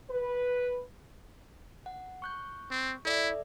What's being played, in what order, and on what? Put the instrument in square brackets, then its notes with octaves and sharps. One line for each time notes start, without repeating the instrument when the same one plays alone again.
[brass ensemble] B4
[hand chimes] F#5
C#6 F#6 G6
[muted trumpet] C4
[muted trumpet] E4 [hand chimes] A4 D5 E5